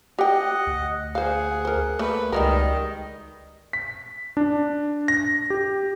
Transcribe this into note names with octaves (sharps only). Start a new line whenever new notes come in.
G4 D#5 F#5 G5
D2
G#4 C5 F5 F#5
A#4 C5
A3 A#3 B4
C#2 D#3 G3 G#3 A#4 D#5
B6
D4
A#6
G4